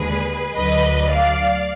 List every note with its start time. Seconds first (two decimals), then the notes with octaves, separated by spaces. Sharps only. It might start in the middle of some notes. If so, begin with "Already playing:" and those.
Already playing: D#2 D3 G#3 G#4 B4
0.54 D2 D3 F#3 B4 D#5
1.09 D5 F5